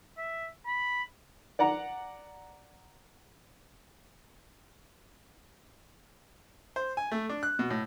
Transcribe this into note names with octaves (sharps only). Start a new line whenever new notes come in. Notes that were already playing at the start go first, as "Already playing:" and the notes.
E5
B5
D5 F#5 A#5
C5
G#5
A3
D4
F#6
B2
A2